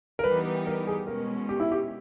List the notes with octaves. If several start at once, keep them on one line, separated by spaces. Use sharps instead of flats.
A#4
E3 G3 B3 D#4 G4 B4
A#4
G#4
B2 G#3 C#4 A#4
G4
E4
G4